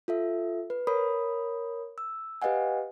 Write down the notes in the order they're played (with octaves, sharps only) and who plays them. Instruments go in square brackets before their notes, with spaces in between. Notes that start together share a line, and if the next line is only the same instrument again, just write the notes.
[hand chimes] F4 A4 E5
B4
A#4 C#5 B5 D#6
E6
G4 B4 D#5 F5 F#5 G#5